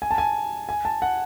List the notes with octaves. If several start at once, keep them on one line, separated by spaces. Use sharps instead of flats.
G#5
A5
G#5
G#5
A5
F#5